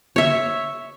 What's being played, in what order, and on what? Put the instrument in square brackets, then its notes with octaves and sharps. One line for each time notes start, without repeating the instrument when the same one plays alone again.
[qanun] C#5 E5